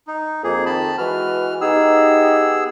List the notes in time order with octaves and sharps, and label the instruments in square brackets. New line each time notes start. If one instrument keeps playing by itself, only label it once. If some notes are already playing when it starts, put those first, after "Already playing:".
[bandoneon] D#4
[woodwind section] F2 [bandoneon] A#3 G#4
[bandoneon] D#3 A5 B5
[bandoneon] E3 F6 [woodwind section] G#3 F#4 B4
[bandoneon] B3 G#4 E6 [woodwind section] D#4 G4